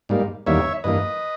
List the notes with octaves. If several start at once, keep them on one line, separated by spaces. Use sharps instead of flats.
G#2 G3 A#3
E2 D#3 G3 A#3 C#5 E5
G2 E3 A#3 B4 D#5